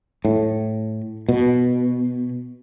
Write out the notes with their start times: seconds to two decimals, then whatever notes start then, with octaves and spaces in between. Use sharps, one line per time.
0.25 A2
1.29 B2